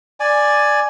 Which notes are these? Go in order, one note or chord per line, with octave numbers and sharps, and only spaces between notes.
D5 G#5